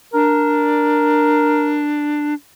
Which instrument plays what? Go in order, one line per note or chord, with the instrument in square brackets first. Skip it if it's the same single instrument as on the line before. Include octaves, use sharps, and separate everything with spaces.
[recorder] D4 [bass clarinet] A#4